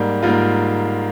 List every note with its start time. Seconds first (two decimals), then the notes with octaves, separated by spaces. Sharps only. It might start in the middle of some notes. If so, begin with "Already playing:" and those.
Already playing: G#2 G3 A#3
0.22 G#2 G3 A#3 F4